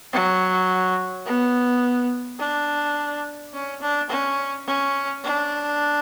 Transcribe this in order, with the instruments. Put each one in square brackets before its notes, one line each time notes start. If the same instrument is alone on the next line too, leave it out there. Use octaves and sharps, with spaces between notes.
[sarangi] F#3
B3
D4
C#4
D4
C#4
C#4
D4